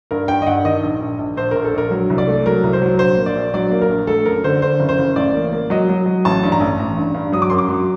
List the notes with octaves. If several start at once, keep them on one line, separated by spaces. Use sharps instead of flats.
G2 A#4
G2 G5
D#5
G2 F#5
D#3 D#5
A#1
A#1
A#1
A#1 C5
A#1 A#4
A4
A#1 A#4
F#3
C2
D5
A3
F#3 A#4
C2
C5
F#3
A#1 C5
A#3
D5
A#1
F#3 D5
A#3
A#4
A#1
A3 A4
F#2 A#4
D3 C5
D3 C5
F#1
C5
F#1
A1 D5
A#3
A#3
F#3 D#5
F#3
F#3
A1 A5
G2
A#5
A1
A1
G2
G2
F#3 D#6
D6
F#2 C6
D6
F#3